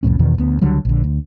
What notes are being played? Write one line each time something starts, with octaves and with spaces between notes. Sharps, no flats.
C2 F2 A2 C#4
E2 B2 D#3
D2 B3
C#2 D3 F#3 G3
A#1 D3
D2